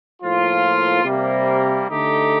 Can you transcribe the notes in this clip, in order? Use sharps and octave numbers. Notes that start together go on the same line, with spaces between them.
A2 F3 A#3 F4
C3 G3 A#3
D3 A3 D#4 G4